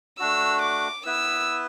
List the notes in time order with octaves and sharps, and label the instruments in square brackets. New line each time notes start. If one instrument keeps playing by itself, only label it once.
[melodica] A3 D4 F#4 [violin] E6
[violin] D6
[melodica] B3 E4 B4 [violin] E6